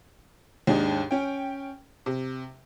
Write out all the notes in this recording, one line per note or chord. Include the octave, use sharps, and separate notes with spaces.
D#2 G#2 D4 D#4
C#4 G5
C3